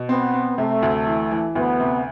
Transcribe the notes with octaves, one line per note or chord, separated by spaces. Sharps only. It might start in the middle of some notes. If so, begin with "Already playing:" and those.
Already playing: B2
B3 C4
C4
C3 A3
D2
E3
E3
D2 B3
C3